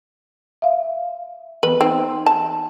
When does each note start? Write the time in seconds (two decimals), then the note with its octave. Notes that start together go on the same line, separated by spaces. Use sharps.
0.62 E5 F5
1.63 E3 B3 B4
1.81 C4 D#4
2.26 A5